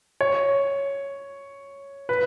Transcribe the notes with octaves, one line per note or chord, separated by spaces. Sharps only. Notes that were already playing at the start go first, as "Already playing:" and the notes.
C#5
B4